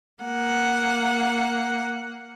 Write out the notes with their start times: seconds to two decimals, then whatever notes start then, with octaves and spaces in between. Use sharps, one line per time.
0.24 A#3 F#5